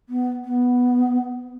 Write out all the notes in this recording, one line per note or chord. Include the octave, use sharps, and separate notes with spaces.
B3
B3